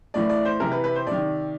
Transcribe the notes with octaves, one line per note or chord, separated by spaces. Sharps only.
A2 E3 D5
D5
C5
C3 E3 A#4
B4
B4
C5
C3 D#3 D5